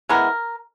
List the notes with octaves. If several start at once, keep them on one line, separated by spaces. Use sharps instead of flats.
E3 G#3 B3 A#4